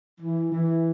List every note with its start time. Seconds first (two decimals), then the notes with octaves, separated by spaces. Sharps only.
0.21 E3
0.51 E3